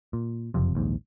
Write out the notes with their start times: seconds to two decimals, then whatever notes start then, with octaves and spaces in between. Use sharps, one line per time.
0.13 A#2
0.54 F#1 F2 C3
0.75 A#1 D#2 G#2